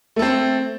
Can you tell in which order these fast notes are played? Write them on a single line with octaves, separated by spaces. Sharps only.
A3 A4 C4